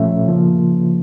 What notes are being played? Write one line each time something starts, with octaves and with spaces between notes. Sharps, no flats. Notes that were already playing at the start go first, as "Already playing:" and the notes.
Already playing: A#2 F3 A3 C#4 E5
C#3 F3 A#3